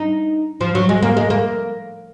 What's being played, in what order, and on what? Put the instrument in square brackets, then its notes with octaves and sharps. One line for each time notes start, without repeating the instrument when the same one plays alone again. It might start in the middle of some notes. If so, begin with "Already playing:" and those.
Already playing: [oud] D#4
F3
F#3
G#3
A#3
G#3
A#3